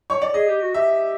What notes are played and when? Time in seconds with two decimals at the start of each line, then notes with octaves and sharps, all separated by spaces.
0.10 C#5
0.22 D5
0.34 G#4 D#5
0.48 G4
0.62 F#4
0.74 G4 E5